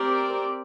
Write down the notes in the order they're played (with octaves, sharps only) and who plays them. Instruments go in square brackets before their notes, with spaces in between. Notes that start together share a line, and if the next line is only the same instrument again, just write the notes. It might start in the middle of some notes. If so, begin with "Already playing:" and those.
Already playing: [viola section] C4 G4 A#4 D5